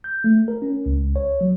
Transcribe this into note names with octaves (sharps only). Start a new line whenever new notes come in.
G6
A3
A#4
C#4
C#2
C#5
F#3